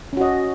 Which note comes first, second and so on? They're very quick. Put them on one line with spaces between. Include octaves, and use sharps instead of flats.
C#4 F#4 D#5